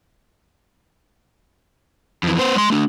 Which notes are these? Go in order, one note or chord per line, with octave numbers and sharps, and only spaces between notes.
F2 E3
B3 C5
G#3 C6
A3 D4